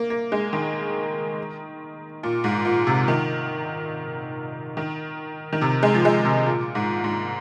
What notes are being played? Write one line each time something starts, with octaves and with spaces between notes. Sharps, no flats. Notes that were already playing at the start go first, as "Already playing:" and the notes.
Already playing: A#3
A#3
G#3
D#3
A#2
G#2
A#2
C3
D#3
D#3
D#3
C3
G#3
F3
G#3
C3
A#2
G#2
G#2